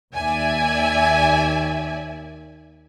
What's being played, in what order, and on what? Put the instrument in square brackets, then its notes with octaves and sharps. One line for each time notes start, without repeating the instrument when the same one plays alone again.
[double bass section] D#2 [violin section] D5 E5 G#5